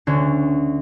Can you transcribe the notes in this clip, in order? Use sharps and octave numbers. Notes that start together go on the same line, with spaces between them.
D2 D3 C#4